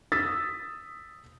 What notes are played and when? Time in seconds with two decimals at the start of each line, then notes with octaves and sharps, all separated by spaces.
0.12 D#6 E6 A6 B6